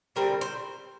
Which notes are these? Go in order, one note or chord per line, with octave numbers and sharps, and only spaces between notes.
D3 G3 C4 A#4
C5